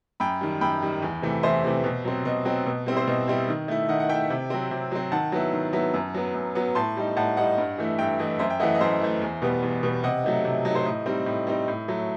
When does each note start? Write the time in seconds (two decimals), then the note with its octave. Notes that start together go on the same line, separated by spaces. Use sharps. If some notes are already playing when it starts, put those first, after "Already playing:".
0.20 F#2 G5 B5
0.41 D#3 G3
0.61 F#2 G5 B5
0.82 D#3 G3
1.02 E2
1.22 C3 E3 A3
1.43 E2 C5 E5
1.64 C3 E3 A3
1.84 B2
2.05 F#3 C4
2.25 B2 D#5
2.45 F#3 C4
2.66 B2
2.86 G3 C4 E4
2.97 C5
3.07 B2 D#5
3.28 G3 C4 E4
3.48 D#3
3.68 A3 E4
3.89 D#3 D#5 F#5
4.00 F#5
4.09 A3 E4 E5 G5
4.30 C3
4.50 F#3 C4
4.71 C3
4.92 F#3 C4
5.12 D#3 F#5 A5
5.32 F#3 B3 E4
5.53 D#3
5.73 F#3 B3 E4
5.94 F#2
6.14 F#3 B3
6.34 F#2
6.55 F#3 B3
6.75 A2 A5 C6
6.97 G3 D#4
7.17 A2 F#5 A5
7.37 G3 D#4 D#5 F#5
7.58 G2
7.78 E3 A3 E4
7.99 G2 E5 G5
8.19 E3 A3 E4 D#5
8.39 F#2 C5 E5
8.50 E5 G5
8.60 A3 D#5 F#5
8.63 E3
8.75 D#5
8.81 F#2 C5 E5
9.01 E3 A3
9.22 E2
9.42 B2 G3 B3
9.63 E2
9.83 B2 G3 B3
10.03 C3 D#5 F#5
10.24 F#3 A3 D#4
10.44 C3
10.65 F#3 A3 D#4
10.75 C5
10.85 A2 D#5
11.06 G3 C4 D#4
11.26 A2
11.47 G3 C4 D#4
11.68 A2
11.88 F#3 A3